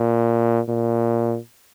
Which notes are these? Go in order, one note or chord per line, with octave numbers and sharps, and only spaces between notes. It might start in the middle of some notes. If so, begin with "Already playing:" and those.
Already playing: A#2
A#2